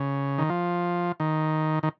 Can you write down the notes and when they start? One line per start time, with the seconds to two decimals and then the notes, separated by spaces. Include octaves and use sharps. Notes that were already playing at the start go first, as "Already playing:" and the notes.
Already playing: C#3
0.38 D#3
0.49 F3
1.20 D#3
1.83 D#3